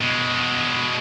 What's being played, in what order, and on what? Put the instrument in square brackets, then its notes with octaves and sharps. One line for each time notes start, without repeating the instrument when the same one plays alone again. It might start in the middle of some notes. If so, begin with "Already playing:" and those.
[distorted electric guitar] B2 G#3